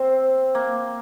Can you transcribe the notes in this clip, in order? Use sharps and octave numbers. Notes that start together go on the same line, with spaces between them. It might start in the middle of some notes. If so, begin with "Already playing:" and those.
Already playing: C4
A#3